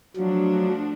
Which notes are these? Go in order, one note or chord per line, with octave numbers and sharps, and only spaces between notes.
F3 F#3 A3 D4 F#4